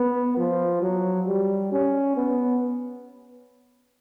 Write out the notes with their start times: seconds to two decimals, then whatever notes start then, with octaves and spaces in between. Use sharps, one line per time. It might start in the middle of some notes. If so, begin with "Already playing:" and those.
Already playing: B3
0.37 F3
0.82 F#3
1.27 G3
1.72 C#4
2.17 B3